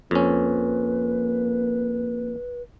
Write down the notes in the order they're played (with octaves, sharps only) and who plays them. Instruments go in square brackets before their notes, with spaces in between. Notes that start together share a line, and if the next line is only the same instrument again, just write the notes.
[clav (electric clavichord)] F2 C#4 [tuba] A#3 [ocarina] B4